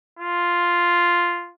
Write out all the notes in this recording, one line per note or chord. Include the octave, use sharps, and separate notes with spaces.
F4